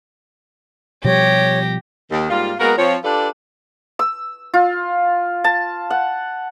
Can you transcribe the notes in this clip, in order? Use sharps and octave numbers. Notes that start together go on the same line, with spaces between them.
B2 F3 G3 G4 C#5 A#6
D#2 D#3
G#2 G3 A#3 F4
G#3 A#3 B3 F#4 A#4
F3 C4 C#5
D4 F4 G4 A4 B4 D5
E6
F4
A5
F#5